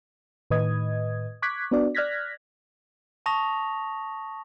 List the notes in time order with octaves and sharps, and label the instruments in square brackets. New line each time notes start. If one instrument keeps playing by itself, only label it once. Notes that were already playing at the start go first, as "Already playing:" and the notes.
[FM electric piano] A2 D#3 B4 D#5 D#6 G#6
C#6 D6 F#6 G#6 B6
B3 D4 F#4 D5
D5 F6 F#6 G#6 A#6 B6
[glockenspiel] A5 C#6 D#6 A#6 F7